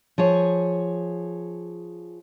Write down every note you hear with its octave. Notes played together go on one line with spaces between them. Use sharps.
F3 G#4 C#5